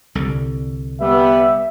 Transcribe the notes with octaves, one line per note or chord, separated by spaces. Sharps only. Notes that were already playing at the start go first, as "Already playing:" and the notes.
C2 D3
G3 B3 E5